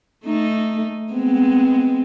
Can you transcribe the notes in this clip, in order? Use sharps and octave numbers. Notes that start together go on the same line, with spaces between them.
A3 D#4
G#3 B3 C4